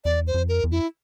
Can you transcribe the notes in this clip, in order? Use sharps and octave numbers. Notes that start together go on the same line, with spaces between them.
E2 D5
C5
F2
A#4
E2
F2 E4